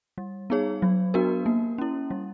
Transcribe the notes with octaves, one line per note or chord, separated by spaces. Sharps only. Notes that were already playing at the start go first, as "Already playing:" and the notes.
G3
B3 D#4 G#4 C#5
F#3
B3 D4 F#4 A#4
A#3
C#4 E4
G3